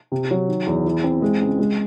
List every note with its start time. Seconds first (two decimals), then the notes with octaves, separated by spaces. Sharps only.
0.12 C3
0.31 F#3
0.48 D#3
0.66 E2
0.85 E3
1.04 C4
1.22 G#3
1.41 C#2
1.59 G#3